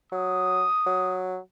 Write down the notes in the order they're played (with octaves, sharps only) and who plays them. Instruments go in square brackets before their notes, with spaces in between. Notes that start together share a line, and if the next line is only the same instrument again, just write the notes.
[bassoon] F#3 [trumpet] D#6
[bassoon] F#3